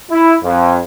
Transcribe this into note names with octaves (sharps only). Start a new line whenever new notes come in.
E4
F2